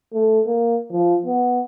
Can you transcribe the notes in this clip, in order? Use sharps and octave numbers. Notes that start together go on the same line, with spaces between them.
A3
A#3
F3
B3